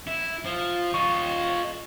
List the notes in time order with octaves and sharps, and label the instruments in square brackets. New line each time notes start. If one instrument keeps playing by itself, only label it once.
[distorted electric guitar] E4
F3
[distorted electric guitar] F4 D#5 [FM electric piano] C#6